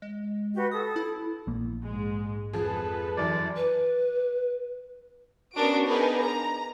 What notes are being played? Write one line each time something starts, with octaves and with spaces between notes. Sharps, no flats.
G#3
F#4 G4 B4
A4 D#6
E4
A#1 A#3
G#2 G#3
F2 F3 G#4 A4 B4
F#2 E3 D5
B4
B3 C#4 D4 F#4 A#4 D7
B3 D4 D#4 G#4 A#4 B4
A#5